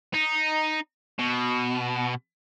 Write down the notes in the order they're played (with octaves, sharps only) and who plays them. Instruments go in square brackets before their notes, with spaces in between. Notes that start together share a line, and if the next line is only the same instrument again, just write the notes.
[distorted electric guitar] D#4
B2